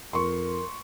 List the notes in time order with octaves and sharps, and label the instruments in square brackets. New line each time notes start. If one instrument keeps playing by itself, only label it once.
[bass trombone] F2 [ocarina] A#4 [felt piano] C6 C#6